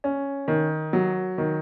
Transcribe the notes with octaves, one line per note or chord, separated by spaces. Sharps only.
C#4
D#3
F#3
D#3